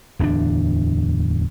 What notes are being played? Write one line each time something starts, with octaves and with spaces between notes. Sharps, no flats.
D1 E2 C4 D4